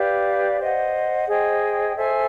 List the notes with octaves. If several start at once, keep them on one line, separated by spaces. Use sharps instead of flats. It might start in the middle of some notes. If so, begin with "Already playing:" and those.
Already playing: G4 B4 D5 F5
C5 D#5 F#5
G#4 C5 D#5 G5
A4 C5 E5 G#5